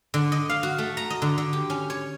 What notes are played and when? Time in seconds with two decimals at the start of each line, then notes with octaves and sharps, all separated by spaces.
0.14 D3
0.32 D#5
0.50 F5
0.63 F#4
0.78 A3
0.97 A#5
1.10 D#5
1.22 D3
1.38 D3
1.53 G4
1.70 C#4
1.90 C#5